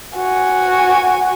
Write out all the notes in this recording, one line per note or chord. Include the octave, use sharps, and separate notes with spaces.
F#4 G#5